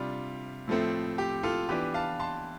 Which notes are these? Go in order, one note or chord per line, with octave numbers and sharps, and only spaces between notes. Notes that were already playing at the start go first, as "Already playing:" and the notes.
Already playing: C3 G3 D4 F4
A2 F3 A3 C4
G4
F4 A4
E3 B3 D4 G4 B4
F5 A5
A5 C6